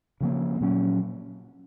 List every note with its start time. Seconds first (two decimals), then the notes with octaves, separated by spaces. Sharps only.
0.21 C#3 F3 A#3
0.61 A#2 F#3 C#4